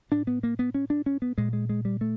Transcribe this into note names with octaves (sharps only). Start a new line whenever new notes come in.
A2 D4
B3
A#3
B3
C#4
D4
C#4
B3
A#2 G#3
G#3
G#3
G3
A3